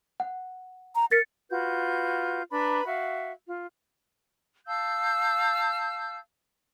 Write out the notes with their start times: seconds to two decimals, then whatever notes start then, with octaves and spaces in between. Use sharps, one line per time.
0.20 F#5
0.95 A#5
1.11 A#4 A6 B6 C#7
1.50 F4 F#4 B4 G6
2.50 D4 B4 A#5 B5
2.87 F#4 E5 F5
3.48 F4
4.66 F5 A5 E6 G6